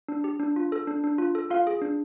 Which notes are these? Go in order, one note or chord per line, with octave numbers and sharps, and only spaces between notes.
D4
G4
D4
F4
A4
D4
D4
F4
A4
F4 F5
G#4
D4